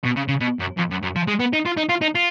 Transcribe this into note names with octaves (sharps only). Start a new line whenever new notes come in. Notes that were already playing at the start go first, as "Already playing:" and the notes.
B2
C#3
C#3
B2
F#2
F2
F#2
F#2
F3
G#3
B3
D#4
F4
D#4
F4
D#4
F4